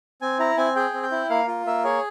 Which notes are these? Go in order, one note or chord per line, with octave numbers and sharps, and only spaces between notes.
C4 G#5
E4 A#5
C4 G#5
G#4 G5
C4
G5
E4
A#3 F5
F4
A#3 E5
G#4 C#5